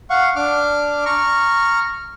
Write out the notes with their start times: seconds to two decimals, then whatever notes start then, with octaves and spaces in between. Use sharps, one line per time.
0.10 F5 F#5 C#6
0.36 D4 D6 F6
1.06 A#5 C#6 F6